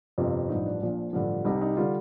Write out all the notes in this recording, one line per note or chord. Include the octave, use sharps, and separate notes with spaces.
G1 F2 C3 F4
A1 G2 F3 D#4
D4
A#1 A#2 F3
A1 G2 D3 F3
C2 C3 G3 D#4
D#4
D3 G3 F4